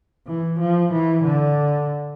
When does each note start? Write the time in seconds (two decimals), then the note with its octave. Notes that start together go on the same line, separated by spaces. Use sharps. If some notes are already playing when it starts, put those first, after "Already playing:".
0.27 E3
0.60 F3
0.92 E3
1.24 D3